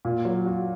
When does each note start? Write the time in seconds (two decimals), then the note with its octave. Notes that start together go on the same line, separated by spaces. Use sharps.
0.05 A#2
0.25 F#3
0.46 F#4